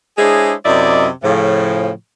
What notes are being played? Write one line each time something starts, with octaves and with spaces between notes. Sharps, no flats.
G#3 D4 E4 G#4 C5 C#5
F#2 C3 E4 D5 D#5
A2 C#3 F3